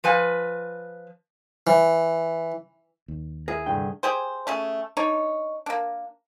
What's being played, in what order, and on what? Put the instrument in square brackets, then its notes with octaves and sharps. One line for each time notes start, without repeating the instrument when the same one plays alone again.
[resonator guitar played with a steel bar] F3 B4 G#5
[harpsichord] E3
[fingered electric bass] D#2
[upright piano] E4 [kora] G#4 [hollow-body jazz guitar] A#4
[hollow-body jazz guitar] C2 G5 [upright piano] G2 D3
[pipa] G4 G#4 C5
A3 C#4 G#4
D4 D#4 C#5
A#3 D4